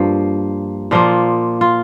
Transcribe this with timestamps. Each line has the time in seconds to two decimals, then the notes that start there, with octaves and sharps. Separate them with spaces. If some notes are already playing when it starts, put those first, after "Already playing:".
Already playing: G2 F3 A#3
0.91 A#2 F3 A#3 F4
1.61 F4